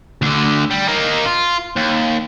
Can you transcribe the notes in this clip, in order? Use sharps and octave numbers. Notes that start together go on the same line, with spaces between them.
D2 D3
G3
A#3 D#4
F4
D#2